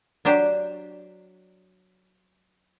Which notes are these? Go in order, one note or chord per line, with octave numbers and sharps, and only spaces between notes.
F#3 D4 G4 C5